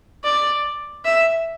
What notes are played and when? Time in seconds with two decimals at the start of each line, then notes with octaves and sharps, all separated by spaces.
0.24 D5
1.05 E5